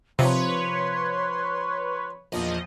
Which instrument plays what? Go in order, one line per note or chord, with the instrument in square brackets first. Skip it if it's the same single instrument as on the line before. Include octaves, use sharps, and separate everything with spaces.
[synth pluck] C3 [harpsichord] F3 D#4 [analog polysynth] B4 C#5 [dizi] C6
[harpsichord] A#1 [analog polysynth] E2 F3 D#5